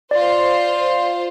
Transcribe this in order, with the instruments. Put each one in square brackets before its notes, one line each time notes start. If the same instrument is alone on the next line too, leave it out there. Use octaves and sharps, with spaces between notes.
[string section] F4 C5 [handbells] D5